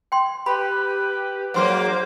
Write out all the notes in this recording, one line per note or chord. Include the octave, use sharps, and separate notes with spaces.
G5 C6
G4 B4 B5
G#2 F#3 A#3 C5 F#5 C6 D6